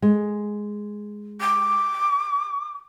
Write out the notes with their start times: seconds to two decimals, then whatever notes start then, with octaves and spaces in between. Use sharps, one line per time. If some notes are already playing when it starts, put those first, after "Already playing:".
0.02 G#3
1.40 D6